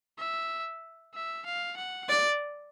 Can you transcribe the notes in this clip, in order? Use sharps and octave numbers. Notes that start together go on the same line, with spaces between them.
E5
E5
F5
F#5
D5